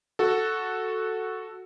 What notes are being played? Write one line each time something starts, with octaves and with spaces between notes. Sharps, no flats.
F#4 A4